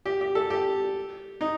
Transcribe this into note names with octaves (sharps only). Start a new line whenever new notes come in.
G4
G4
A4
G4
D#4